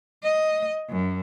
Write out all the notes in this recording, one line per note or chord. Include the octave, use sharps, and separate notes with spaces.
D#5
F#2